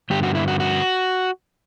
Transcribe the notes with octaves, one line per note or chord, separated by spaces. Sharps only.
G2 D3 G4
F#4
E4
F#4
F#4